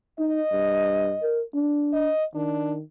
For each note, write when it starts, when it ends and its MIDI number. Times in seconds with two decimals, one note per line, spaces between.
0.19 0.41 63
0.19 1.38 75
0.52 1.14 43
1.23 1.42 70
1.55 2.10 62
1.93 2.24 75
2.35 2.82 51
2.35 2.75 62